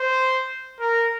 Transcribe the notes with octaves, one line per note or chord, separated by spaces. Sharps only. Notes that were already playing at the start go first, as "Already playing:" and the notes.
Already playing: C5
A#4